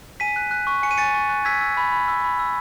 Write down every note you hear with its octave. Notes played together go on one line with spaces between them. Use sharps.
G#5 B6 D#7
F#6
F#6
C#6
G#5 C#7
D#7
G#5 A6 C#7
C#6
F#6
E6 G#6 B6
E6
B5
B5
E6
B5
E6